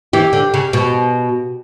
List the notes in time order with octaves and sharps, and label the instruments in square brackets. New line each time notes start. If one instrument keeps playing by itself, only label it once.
[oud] E3 [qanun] G4
[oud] D3
C#3
B2